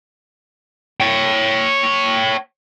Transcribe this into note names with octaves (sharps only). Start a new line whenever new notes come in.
C#5 G5